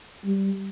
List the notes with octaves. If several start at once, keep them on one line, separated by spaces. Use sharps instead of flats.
G3